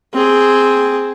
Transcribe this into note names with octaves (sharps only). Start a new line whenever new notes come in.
C4 G#4